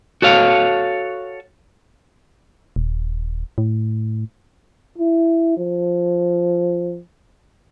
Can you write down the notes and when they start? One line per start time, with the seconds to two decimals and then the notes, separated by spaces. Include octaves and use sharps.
0.22 F#4 A4 C#5 F5
2.76 D#1
3.58 A2
4.98 E4
5.57 F3